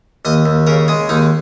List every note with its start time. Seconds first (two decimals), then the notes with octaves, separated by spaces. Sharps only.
0.25 D#2 D#5
0.45 D#2
0.67 C#3 A#4
0.88 G#3 G#4
1.09 D#2 D#4